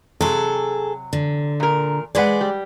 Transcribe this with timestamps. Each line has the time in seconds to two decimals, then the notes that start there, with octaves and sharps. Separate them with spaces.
0.21 C3 F#3 G#4 A4
1.13 D3
1.60 A#2 A#4
2.15 G#3 G#4 B4 C5 D5 F#5
2.41 G3